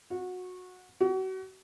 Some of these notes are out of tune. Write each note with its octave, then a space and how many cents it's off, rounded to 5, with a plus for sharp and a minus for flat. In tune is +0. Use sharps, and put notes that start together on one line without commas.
F#4 -20
F#4 +35